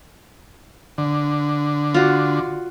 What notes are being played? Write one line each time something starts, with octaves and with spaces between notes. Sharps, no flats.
D3
F4 F#4